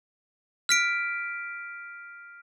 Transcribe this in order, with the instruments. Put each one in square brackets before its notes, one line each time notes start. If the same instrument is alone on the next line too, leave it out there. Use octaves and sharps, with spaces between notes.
[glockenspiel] F6 B6 D7